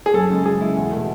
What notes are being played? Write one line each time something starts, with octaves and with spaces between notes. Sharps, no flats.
G#4
F#2 A4
C#3 G#3
F#2 G#4
C#3 G#3 E4
E2
B2 A3